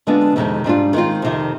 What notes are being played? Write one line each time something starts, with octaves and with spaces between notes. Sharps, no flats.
D3 G#3 B3 D4 F4
F2 C3 D#3 G#3 C4
G#2 G3 D4 F4
D#3 G#3 C4 F4
F2 C3 D#3